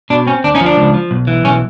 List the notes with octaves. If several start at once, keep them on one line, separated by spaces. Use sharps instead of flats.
B2 D4
C4 C#4
D2 D4
C#4 D#4
F3
D4
C#2
F3
B1
E3
B1 C#4